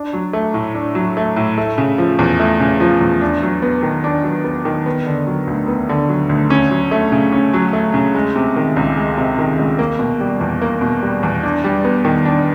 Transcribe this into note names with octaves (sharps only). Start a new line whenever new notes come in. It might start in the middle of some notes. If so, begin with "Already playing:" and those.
Already playing: D4
F#3
A3
A2
D4
F#3
A3
A2
A3
C#3
F3
E2
A3
C#3
F3
E2
D4
F#3
B3
D#3
D4
F#3
B3
D#3
B3
D3
F#3
D2
B3
D3
F#3
D2
C#4
F#3
A3
C#3
C#4
F#3
A3
C#3
G#3
C3
D#3
C#2
G#3
C3
D#3
C#2
A#3
B2
G3
E2
A#3
B2
G3
E2
D4
G3
B3
D#3
D4